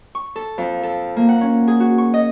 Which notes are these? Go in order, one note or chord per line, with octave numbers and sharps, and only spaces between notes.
C#6
A4
F2
A4
A#3
F#5
C#4
G#4
F#4
C#6
D#5